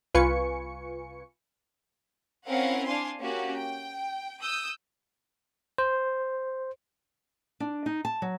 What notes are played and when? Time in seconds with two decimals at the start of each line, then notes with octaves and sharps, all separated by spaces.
0.15 C2 F4 B4 G#5 C#6 C#7
2.47 C4 C#4 E4 A#4 F5 F#5
2.86 D4 F5 G#5 C6
3.19 A#3 C#4 F#4 G4
3.54 G5
4.42 D#6 E6 G6
5.78 C5
7.60 D4
7.86 D#4
8.05 A5
8.22 F#3